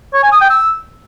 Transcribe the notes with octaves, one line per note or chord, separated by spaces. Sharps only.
C#5
G#5
D#6
G5
E6